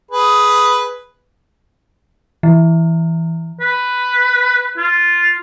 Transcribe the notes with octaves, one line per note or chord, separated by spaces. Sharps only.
G#4 B4
E3
B4
F4